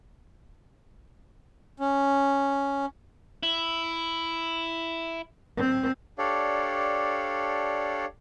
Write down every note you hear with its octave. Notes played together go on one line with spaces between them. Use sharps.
C#4
E4
C4
D4 G4 A4 C#5 D5 F5